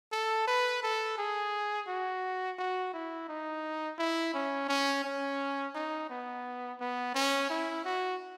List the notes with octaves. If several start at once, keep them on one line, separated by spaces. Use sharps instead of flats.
A4
B4
A4
G#4
F#4
F#4
E4
D#4
E4
C#4
C#4
C#4
D#4
B3
B3
C#4
E4
F#4